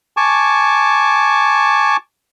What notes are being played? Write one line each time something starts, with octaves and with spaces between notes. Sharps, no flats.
G#5 A5 C#6 D6